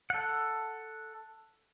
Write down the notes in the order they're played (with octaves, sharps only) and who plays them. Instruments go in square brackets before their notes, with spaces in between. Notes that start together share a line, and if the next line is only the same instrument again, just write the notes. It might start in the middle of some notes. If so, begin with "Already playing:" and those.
[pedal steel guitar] A4 F#5